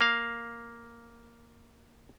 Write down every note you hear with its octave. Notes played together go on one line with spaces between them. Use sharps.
A#3 F5